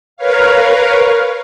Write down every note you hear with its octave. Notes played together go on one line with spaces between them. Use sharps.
A#4 B4 C#5 F5